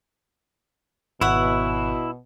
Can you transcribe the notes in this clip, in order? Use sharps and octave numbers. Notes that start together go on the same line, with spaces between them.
G#1 B2 E4 C#5 E5 F#5